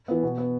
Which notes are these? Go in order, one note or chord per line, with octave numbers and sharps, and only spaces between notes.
E3 B3
B2
B3